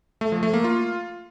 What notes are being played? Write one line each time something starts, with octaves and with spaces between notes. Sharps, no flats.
A3
F3
A3
A#3
F4